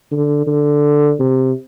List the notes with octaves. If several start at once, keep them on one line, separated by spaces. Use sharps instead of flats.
D3
D3
C3